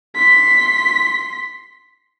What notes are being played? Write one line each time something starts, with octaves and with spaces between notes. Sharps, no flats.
C6 B6